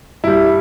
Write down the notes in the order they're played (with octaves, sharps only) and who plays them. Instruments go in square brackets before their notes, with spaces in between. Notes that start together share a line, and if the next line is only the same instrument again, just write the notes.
[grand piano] G2 G3 E4